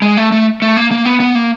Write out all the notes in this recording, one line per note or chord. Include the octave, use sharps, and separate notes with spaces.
G#3
A3
A3
A3
A#3
A#3
B3
B3
A#3